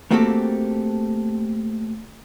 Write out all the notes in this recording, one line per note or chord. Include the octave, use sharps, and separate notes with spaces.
A3 A#3 C4 F#4 G4 A4